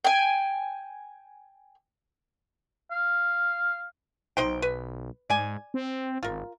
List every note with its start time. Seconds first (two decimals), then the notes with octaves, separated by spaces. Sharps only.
0.04 G5 G#5
2.91 F5
4.37 B1 D#4 C5 G5
4.62 B4
5.30 G#2 D5 G#5
5.74 C4
6.23 G#1 F4 A#4